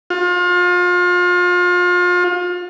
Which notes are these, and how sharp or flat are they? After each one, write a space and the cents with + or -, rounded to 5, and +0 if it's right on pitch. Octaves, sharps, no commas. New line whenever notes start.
F4 +35